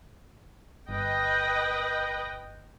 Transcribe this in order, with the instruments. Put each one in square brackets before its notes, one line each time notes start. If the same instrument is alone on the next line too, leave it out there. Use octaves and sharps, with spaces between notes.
[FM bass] G1 [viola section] B4 D#5 G5